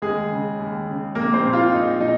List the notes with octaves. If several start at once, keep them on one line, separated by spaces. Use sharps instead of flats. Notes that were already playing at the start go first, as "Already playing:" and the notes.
D#2 G#3 G#4
C#3
D#2
C#3
A#1 A#3 A#4
C4 C5
A#2
F4 F5
A#1 D#4 D#5
A#2 D#4 D#5